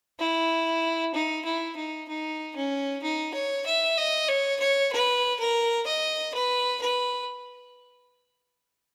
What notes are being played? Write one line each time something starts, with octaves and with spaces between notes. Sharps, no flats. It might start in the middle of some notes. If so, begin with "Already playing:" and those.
E4
D#4
E4
D#4
D#4
C#4
D#4
C#5
E5
D#5
C#5
C#5
B4
A#4
D#5
B4
B4